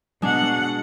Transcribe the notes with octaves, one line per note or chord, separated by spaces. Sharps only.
B2 G#3 D4 F#5